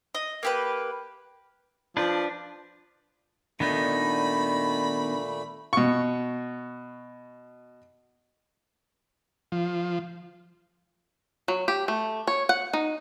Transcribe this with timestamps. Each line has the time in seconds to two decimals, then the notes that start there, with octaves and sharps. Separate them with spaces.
0.14 D#5
0.43 A#3 G4 B4
1.97 F3 D4 B4
3.60 A#2 D#3 A3 B3 D4 D#4 B5
5.73 B2 C#6
9.52 F3
11.48 F#3
11.68 G4
11.88 A3
12.27 C#5
12.49 F#5
12.73 D#4